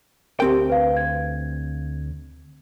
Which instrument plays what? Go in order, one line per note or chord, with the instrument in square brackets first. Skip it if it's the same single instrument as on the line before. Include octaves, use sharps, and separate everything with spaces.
[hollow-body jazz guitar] D2 C4 G5 [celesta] G4 A#4
[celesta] B4 F5
G#6